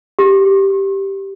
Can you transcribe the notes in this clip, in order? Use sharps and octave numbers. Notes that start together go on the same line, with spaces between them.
G4